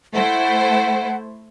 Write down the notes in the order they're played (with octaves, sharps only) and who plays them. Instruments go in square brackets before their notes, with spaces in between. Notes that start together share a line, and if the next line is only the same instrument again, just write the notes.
[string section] A3 E4 C5 [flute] F#5